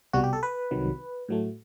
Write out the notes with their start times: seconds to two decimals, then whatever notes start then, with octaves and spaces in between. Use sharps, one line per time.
0.13 C2 B2 G3 F#4
0.24 G4
0.33 A4
0.43 B4
0.71 C2 C3 D#3 F#3
1.29 A2 F#3 A3